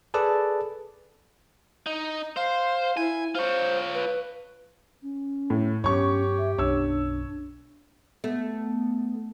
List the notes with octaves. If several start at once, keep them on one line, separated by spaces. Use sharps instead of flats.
G#4 A4 B4 D5 A5
D#4
C5 F5
E4 G#5
F4 C5 C#5
B4
C#4
A2
G2 F#3 B3 C#4 G4 C#5 C#6
E5
B1 F#2 D4 C#5 E6
A3 B3